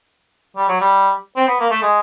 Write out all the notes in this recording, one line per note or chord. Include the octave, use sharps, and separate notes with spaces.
G3
F#3
G3
C4
B3
A#3
A3
G#3